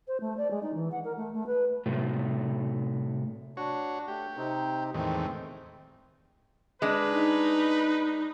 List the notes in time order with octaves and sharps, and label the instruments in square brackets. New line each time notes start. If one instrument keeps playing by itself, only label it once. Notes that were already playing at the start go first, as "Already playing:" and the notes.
[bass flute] C5
A3
D5
G#3
D#4
E3
F#5
A#4
A3
A3
B4
[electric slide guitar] A2 C3 F#3 A3
[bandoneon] D4 [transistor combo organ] F#4 C#5
[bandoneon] A3 [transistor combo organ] G4
[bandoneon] C3 C4 D#4
[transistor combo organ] E2 A2 D#3 [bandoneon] G#3 C4
[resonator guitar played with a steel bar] G#3 D4 [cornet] B4
[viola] D#4